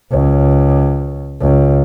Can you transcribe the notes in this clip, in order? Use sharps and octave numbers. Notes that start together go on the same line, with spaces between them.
C#2
C#2